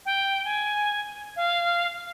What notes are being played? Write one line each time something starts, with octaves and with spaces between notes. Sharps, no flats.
G5
G#5
F5